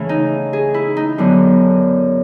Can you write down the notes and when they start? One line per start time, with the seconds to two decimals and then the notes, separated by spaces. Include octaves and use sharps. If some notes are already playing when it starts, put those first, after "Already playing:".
Already playing: C#3 E3 A3 C#4
0.09 D#4
0.53 G#4
0.74 E4
0.97 D#4
1.18 F#2 D3 F#3 B3